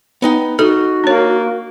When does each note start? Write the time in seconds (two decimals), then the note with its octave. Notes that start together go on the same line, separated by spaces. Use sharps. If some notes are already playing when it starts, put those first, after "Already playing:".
0.22 B3 D#4 G5
0.59 D#4 F#4 A4
1.04 A#3 D4 C#5